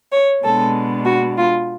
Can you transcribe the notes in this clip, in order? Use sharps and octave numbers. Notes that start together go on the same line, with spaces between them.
C#5
B2 G#3 B3 D4 A4
F#4
F4